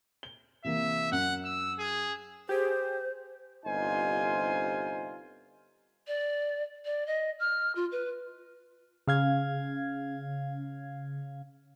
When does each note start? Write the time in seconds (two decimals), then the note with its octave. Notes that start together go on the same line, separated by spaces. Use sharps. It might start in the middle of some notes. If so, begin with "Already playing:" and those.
0.23 G7
0.64 C3 E3 A#3 E5
1.12 F#2 F#5
1.44 E6
1.79 G#4
2.49 G4 G#4 C5
3.66 G1 C3 D#4 F4 C5 G#5
6.07 D5
6.85 D5
7.06 D#5
7.39 F6
7.75 F4
7.91 B4
9.07 C#3 F5 G#6